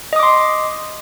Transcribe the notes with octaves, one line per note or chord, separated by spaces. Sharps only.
D#5 C6 D6 D#6